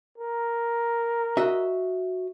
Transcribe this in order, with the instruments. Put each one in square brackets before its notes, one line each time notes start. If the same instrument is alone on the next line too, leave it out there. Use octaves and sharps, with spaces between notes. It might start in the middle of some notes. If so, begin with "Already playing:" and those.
[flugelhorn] A#4
[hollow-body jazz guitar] F#4 D#5 E5